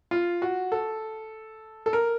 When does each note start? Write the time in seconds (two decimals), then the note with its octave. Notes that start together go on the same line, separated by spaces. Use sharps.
0.11 F4
0.42 F#4
0.72 A4
1.86 A4
1.93 A#4